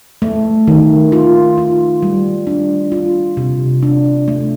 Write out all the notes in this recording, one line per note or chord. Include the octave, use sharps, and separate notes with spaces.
A3
D#3
F4
F4
G3
D4
F4
C3
D4
A3